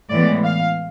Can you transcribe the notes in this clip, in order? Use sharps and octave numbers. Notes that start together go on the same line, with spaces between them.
A2 E3 G#3 B3 D5
F5